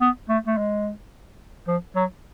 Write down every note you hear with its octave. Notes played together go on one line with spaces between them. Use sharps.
B3
A3
A3
G#3
F3
F#3